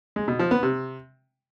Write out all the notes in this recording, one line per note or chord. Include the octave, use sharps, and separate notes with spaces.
G#3
B2
F3
B3
C3